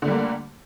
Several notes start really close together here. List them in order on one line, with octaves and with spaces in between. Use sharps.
D3 A3 G3 A#3